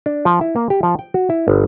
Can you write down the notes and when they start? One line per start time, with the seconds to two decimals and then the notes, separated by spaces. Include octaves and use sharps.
0.06 D4
0.25 F3
0.41 E4
0.56 A#3
0.70 G4
0.83 F3
0.99 G5
1.14 F#4
1.30 E4
1.48 G1